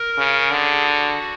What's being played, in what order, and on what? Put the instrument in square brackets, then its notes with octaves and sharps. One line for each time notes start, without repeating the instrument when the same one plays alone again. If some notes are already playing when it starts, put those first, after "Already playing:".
Already playing: [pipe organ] A#4
[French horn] C#3
[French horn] D3 [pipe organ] G#4
[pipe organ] F#4